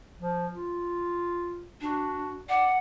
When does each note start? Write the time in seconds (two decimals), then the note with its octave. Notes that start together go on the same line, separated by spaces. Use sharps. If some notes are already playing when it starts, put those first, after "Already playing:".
0.20 F3
0.54 F4
1.81 D4 F#4
2.49 D5 F#5